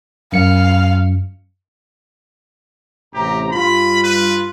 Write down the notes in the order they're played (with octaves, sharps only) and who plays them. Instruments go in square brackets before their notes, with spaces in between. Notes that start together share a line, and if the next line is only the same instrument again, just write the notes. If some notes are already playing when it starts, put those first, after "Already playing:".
[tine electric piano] F#2 C#7 [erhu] F5
[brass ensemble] A1 C3 A#5 [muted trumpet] G4
[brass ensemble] G2 F4 [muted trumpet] B5
[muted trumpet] B4